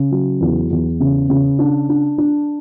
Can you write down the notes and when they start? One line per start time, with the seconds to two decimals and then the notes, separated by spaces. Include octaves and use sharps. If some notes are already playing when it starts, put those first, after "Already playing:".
Already playing: C#3
0.11 F#3
0.41 E2
0.71 E2
1.00 C#3
1.30 C#3
1.59 D4
1.89 D4
2.18 D4